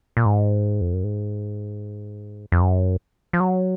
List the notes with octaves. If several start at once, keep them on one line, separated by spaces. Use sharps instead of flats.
A#2
G#2
F2
F#2
G#2
F2
F#2
F3
F#3